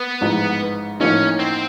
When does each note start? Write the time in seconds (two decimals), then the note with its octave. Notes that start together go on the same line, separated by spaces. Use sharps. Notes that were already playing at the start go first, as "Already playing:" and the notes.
Already playing: B3
0.21 A1 G#2 F3
1.00 A1 A2 F3 A#3 C#4 D#4
1.39 C4